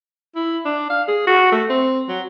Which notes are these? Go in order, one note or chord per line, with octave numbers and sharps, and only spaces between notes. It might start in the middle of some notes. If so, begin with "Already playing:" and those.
E4
D4
F5
G#4
F#4
A3
C4
F#3